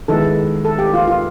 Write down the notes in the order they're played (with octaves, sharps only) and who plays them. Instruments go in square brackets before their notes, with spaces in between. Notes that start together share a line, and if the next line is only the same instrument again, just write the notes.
[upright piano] D#3 G#3 B3 E4 [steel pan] A4
[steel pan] A4
G4
F4
F4